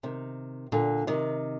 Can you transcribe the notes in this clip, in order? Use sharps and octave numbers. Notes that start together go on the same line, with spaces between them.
C3 D#3
A#2 D3
C3 D#3